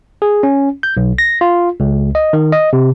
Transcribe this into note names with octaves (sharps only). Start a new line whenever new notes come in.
G#4
C#4
G6
B1
A#6
F4
C#2
D#5
D#3
D#5
C3